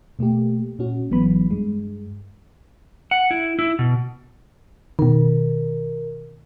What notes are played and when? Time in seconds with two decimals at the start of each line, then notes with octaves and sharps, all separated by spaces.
0.19 B2 A3 A#3 G4
0.79 A#2 C#4 F#4
1.11 G#1 E3 F#3 B3 B5
1.50 G2 G#3
3.11 F#5
3.31 E4
3.59 E4
3.79 B2
4.99 B2 D#3 A#4